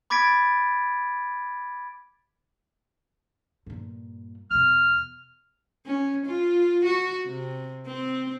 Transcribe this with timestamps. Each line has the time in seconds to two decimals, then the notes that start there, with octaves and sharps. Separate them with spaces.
0.10 B5 D6 G#6 A6 B6 D7
3.66 G2 A#2
4.50 E2 B2 F6
5.86 C#4
6.26 F4
6.85 F#4
7.27 C3
7.86 C4